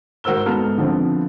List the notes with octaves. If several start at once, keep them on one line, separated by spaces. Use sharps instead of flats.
G#2 F#4 A#4 C5 E6 G7
G#2 B3 A4 A#5 F6
D3 F3 A3 B3 C4